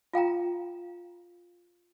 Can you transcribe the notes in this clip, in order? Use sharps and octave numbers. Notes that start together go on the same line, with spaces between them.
F4 F5 G5 A#5